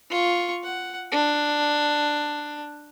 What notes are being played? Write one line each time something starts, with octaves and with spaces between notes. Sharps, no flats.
F4 C#6
F#5
D4